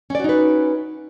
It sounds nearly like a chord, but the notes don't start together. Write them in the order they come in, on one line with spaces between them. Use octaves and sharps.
C#4 D5 F#4 D#4 B4